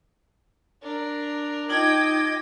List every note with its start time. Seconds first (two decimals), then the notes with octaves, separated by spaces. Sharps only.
0.83 D4 A#4
1.70 D#4 F4 D#5 G5 A5 D6 G#6